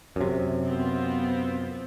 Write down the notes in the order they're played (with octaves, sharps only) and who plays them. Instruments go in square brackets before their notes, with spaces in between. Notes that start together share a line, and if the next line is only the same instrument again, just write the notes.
[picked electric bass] F#2 C3
[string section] B3 C4 F4